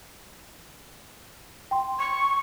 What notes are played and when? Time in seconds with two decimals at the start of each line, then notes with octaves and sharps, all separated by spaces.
1.71 G5 C6
1.99 C#6